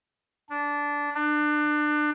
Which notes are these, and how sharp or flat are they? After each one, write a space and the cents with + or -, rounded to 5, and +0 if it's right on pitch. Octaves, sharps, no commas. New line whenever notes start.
D4 -15
D4 +30